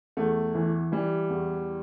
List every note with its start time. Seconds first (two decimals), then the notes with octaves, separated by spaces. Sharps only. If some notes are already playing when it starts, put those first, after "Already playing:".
0.17 E2 A3
0.55 E3
0.92 E3 G3
1.30 E2